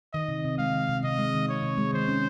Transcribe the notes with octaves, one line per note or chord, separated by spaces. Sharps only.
D#3 D#5
C3
C3
G#3 F5
D#3
C3
C3 D#5
G#3
D#3
C3 C#5
C3
G#3
D#3 C5
C#4